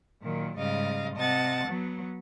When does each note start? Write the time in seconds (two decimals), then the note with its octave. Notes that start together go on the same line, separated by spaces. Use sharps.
0.21 A#2 D#3 F#3
0.57 G#2 C#3 G3 D#5 F5
1.15 C3 D#5 F#5 A5 A6
1.66 F#3 B3